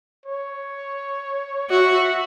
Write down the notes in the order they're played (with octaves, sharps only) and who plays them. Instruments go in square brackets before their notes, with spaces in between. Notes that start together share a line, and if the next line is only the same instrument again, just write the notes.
[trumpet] C#5
[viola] F#4 [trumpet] E5